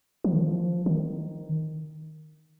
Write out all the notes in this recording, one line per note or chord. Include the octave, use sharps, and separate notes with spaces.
F3
D#3
F3
D#3